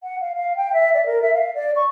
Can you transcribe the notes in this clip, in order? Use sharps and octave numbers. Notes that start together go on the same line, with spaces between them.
F#5
F5
F5
G5
E5
D5
A#4
E5
F5
D5
C#6